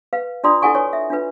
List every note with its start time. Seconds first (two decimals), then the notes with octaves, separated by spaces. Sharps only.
0.13 B4 F5
0.44 D4 F4 D5 A#5 C6 D#6
0.62 E4 A4 A#4 F#5 G#5 C#6
0.75 B4 C#5 G#5 C#6
0.93 E5
1.10 D4 F4 B4